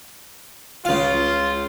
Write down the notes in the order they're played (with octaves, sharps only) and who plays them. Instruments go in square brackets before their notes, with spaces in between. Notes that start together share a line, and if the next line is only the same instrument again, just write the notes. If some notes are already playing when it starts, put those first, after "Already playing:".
[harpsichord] C#2 F5 [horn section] F4